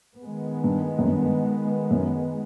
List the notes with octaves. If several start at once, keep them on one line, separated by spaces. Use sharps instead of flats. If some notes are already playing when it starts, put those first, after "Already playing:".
D#3 G#3 B3
G2
F#2
G2
F#2